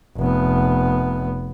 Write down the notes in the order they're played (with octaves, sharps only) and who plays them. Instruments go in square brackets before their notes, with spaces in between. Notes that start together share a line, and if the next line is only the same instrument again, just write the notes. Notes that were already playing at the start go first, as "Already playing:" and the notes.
[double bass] F1 B3